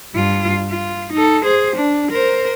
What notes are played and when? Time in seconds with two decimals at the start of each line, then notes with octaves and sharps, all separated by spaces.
0.15 G2 F4
0.71 F4
1.13 D#4 A4
1.44 G#4 C5
1.76 D4
2.12 A#4 C5